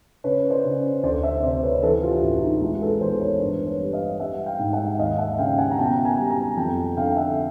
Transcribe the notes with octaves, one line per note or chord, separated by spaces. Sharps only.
C#3 B4 C#5
C5 D5
C#3
D2 C5 D5
D5 E5
C3 C5 D5
B4 C#5
E3 A4 B4
F4 G4
A1 E4 F#4
D#4 F4
G#3 E4 F#4
A4 B4
E2 A#4 C5
B4 C#5
G2
B4 C#5
G3
D#5 F5
G3 E5 F#5
F5 G5
G#2
E5 F#5
D#2 D#5 F5
E5 F#5
C#3 F5 G5
F#5 G#5
A#5
B2 G5 A5
G#5 A#5
G3
G#5 A#5
F2 G5 A5
D3 F5 G5
E5 F#5